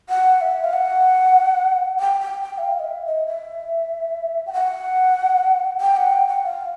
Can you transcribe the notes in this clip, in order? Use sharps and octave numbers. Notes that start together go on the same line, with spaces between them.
F#5
E5
F5
F#5
G5
G5
G5
E5
F5
D#5
E5
D#5
E5
G5
F#5
G5
F#5
G5
F#5
F5